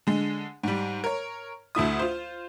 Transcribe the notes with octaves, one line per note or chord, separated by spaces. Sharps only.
D3 G#3
G#2 G3
A#4 C#5
D2 A3 E4 D#6
F4 C5